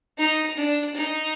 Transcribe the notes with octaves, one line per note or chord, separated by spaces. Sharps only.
D#4
D4
D#4